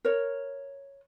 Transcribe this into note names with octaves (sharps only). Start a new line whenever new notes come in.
A#4 C#5